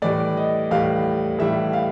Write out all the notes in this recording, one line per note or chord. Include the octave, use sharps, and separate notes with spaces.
A2 E3 G3 D5
D#5
A2 E3 G3 F5
A2 E3 G3 E5
F5